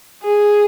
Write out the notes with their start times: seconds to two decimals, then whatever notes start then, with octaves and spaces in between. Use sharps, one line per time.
0.23 G#4